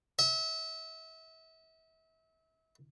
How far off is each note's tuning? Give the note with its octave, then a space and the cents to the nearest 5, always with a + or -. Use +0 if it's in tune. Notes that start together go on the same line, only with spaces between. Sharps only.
E5 -35